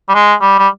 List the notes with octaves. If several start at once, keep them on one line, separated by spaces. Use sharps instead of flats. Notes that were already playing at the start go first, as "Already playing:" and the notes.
G3
G#3
G3
G3